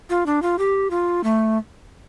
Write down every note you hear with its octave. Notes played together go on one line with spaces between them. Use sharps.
F4
D4
F4
G4
F4
A3